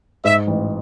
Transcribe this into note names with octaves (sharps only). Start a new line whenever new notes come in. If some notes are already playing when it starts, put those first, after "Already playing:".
G#2 E5
A1